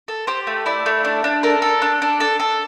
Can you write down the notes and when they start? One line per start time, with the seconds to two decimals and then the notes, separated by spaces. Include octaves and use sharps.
0.08 A4
0.27 G4 C5
0.47 A3
0.66 E4 D5
0.86 A3
1.04 D4
1.24 D4
1.43 A4 A#4
1.62 A4
1.82 D4
2.02 D4
2.20 A4
2.40 A4